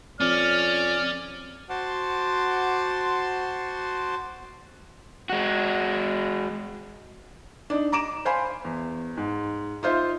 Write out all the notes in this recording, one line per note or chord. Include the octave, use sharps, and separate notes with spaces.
F2 C#4 D5 F6
F#4 C5 F#5 A5 C6 D6
G#3 F#4
D4 D#4
A#5 D6 D7 E7
C5 F5 G#5 B5 C6
E2
G#2
D#4 F4 C5 E5